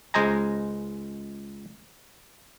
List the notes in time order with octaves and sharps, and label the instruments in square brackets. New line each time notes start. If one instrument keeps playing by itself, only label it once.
[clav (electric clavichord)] C#2 G#3 C5 D#5 G#5 A#5